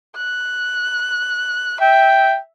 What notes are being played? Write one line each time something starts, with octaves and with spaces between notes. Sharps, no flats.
F#6
E5 G5